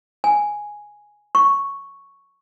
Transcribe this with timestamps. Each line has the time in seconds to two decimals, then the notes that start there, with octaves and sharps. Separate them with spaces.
0.24 G#5
1.35 C#6